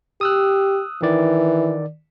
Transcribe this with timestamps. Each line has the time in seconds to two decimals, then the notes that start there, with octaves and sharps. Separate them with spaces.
0.21 G4 D#6 E6 F#6
1.02 D#3 E3 D5